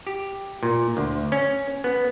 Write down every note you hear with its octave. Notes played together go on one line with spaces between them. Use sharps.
G4
A#2
D2
C#4
B3